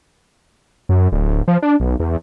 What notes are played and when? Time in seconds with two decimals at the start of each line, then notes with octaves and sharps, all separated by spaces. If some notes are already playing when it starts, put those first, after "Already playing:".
0.89 F#2
1.12 D1
1.48 F3
1.62 D4
1.80 B1
2.00 E2